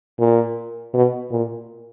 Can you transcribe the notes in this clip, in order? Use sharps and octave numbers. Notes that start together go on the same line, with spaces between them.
A#2
B2
A#2